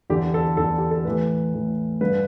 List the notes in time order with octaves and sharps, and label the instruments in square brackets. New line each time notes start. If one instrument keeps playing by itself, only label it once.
[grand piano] E2 D3 G4
A4
E2 D3 A4
G4
A4
A2 E3 B4
A2 E3
G2 D3 B4